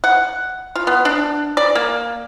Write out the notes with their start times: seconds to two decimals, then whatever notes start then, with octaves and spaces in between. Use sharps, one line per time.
0.04 F#5
0.76 F4
0.87 B3
1.05 D4
1.57 D5
1.75 A#3